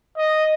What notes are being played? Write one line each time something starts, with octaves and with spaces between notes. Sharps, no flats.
D#5